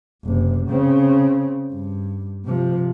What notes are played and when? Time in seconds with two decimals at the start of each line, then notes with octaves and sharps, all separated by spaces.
0.24 F#1 C3
0.67 C#3 C4
1.71 G2
2.45 C3 F3